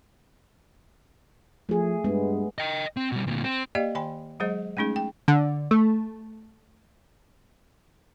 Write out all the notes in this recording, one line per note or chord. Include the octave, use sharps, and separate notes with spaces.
F3 A3 G#4
G2 G#3 B3
D#5 G5
C4
B2 G3
D2 A#2
C4
A#3 G4 D5 D#5 F5
D#3 G5 G#5 B5
F#3 G#3 G#4 C5 D#5
G#3 A3 C#4 D#4 G#4
G5
D3
A3